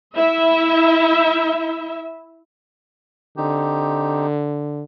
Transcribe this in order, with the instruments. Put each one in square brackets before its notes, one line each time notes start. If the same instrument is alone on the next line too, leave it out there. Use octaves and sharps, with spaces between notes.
[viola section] E4 E5
[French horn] D3 [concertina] C4 D#4 G4